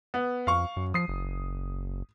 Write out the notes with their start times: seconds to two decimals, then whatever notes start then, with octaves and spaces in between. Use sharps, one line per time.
0.14 B3
0.47 F2 F5 C#6
0.77 F#2
0.94 F3 D#6 C7
1.08 F#1